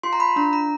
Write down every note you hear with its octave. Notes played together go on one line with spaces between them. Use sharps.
F4 C6
A#5
B5
D4 A#5
A#5